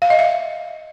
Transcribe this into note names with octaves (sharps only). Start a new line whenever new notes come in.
F5
D#5
E5